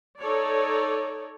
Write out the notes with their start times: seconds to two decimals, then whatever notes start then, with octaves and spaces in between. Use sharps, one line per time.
0.20 D#4 A4 C#5 D5